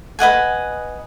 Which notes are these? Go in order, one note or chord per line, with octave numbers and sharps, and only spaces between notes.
B4 D#5 F#5 G#5